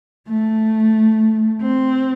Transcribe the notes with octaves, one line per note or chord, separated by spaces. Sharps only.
A3
C4